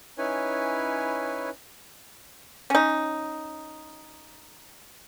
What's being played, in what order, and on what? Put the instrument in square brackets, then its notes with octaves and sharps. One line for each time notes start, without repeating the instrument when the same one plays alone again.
[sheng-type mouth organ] C#4 D#4 E4 B4 C#5 G#5
[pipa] C#4 D#4